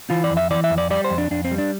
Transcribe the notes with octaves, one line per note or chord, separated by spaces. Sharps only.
E3 F4
D5
F2
E5
E3 D5
E5
F2
D5
G3 D5
C5
F2
D4
F2 D4
C4
G3
D4